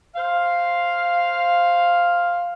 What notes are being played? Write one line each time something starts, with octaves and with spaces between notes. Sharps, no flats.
C5 F5